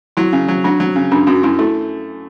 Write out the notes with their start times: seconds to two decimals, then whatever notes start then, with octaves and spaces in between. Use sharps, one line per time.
0.17 F#3 E4
0.33 C#3
0.48 F#3
0.64 F#3 D4
0.80 F#3
0.96 C#3
1.11 F#2 D4
1.27 F#2 F#4
1.43 F#2 E4
1.59 A3 E4